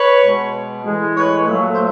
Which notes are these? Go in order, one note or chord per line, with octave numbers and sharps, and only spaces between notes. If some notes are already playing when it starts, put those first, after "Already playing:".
Already playing: B4 C#5
B2 G#3
A2 E3 G#3
B4 C#5
A#2 F#3 A3
C5